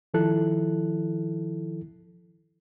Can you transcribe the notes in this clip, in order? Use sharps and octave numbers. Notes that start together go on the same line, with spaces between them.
D#3 F3 E4 A4 F#6